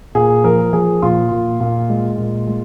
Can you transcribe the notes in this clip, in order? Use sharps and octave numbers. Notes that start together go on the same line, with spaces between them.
A#2 G#4
F3 A#4
F3 G#4
A#2 F4
A#2
A#2
G#3
A#2
G#3